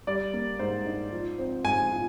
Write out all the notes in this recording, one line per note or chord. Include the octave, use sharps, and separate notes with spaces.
G3 D5
A#3
G#2 C5
D#4
F3
C4
G#2 G#5
F4